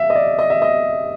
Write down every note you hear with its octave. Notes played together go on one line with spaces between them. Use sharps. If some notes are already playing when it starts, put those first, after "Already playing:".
Already playing: E5 F5
D#5
D5
D#5
E5
D#5